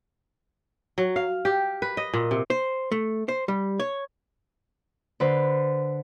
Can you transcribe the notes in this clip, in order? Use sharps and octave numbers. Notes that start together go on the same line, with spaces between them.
F#3
F5
G4
B4
D#5
A#2
C3
C5
A3
C5
G3
C#5
D3 B4 C5